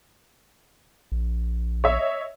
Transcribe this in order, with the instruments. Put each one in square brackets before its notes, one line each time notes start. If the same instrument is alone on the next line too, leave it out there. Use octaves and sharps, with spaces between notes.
[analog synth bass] A#1
[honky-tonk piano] C#5 D#5 E5